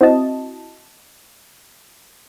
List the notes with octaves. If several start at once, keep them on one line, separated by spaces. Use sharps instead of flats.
C4 E4 F#4 D#5 A5